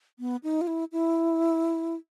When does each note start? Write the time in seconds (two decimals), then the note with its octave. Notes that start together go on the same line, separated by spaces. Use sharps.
0.19 B3
0.43 D#4
0.61 F4
0.67 E4
0.92 E4